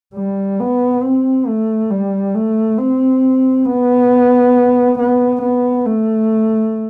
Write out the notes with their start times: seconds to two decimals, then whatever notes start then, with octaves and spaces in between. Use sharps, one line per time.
0.15 G3
0.59 B3
1.03 C4
1.47 A3
1.90 G3
2.34 A3
2.78 C4
3.66 B3
4.98 B3
5.42 B3
5.86 A3